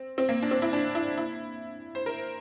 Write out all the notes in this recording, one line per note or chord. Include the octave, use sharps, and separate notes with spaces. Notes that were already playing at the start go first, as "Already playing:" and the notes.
Already playing: C4
C4
A#3
D4
C4
E4
D4
E4
E4
C5
A#4